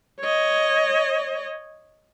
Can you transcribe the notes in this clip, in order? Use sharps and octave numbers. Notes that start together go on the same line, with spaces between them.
C#5 D#5